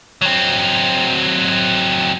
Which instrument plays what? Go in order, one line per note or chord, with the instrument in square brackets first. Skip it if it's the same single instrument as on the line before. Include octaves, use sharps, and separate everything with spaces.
[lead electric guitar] F#3 C4